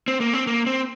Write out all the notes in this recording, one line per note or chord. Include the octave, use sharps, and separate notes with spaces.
C4
A#3
C4
A#3
C4